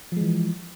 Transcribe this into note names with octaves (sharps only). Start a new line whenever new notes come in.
E3 F3 G#3